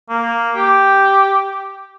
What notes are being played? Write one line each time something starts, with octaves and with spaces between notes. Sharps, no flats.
A#3
G4